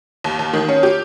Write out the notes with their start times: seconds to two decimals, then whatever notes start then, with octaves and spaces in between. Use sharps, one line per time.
0.24 D#2
0.39 D#2
0.53 D#3
0.69 C#4
0.83 G4